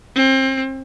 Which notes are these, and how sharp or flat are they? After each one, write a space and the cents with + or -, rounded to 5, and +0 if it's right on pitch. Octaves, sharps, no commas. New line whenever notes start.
C4 +30